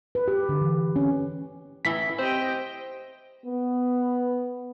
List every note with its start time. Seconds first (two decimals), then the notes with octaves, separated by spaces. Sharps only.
0.15 B4
0.28 G4
0.49 D3
0.61 E3
0.96 C#4
1.85 A1 E3 E4 B6
2.19 C4 G4 C5 D#5 G5
3.46 B3